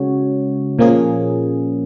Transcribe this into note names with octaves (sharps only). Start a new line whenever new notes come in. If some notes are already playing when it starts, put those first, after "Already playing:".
Already playing: C#3 G#3 C#4 F#4 C#5
A#2 F3 A#3 C#4 G#4